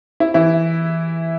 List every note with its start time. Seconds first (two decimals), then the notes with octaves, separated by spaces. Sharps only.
0.20 E4
0.34 E3 E4